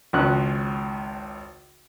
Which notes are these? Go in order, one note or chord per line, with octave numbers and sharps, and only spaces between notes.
G#1 C#2 C#4 F#6